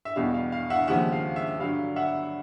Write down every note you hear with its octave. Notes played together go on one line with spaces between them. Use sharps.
E5
E2 B2 G3 F5
F5
F5
E5 F#5
D#2 C#3 F3 G#3 E5 F#5
F5
E5
G2 D3 F#3 F5
E5 F#5